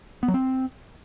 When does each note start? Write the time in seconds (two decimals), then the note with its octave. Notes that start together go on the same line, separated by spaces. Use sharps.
0.23 B3
0.28 F#3
0.34 C4